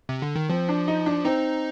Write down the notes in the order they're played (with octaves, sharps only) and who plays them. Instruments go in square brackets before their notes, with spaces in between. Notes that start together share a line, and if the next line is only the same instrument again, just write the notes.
[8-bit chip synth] C3
D3
D#3
[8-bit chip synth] F3 [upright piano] C4
[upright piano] D4
D#4
D4
[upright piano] C4 [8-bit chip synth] D#4